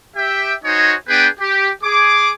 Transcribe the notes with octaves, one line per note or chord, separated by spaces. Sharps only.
G4 E5 G5
D#4 F#4 C5 C#5 D#5 G#5
B3 D4 G#4 B4 G5
G4
G#4 D6